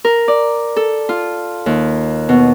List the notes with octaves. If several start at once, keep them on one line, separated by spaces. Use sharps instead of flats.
A#4
D5
A4
F4
D#2
B2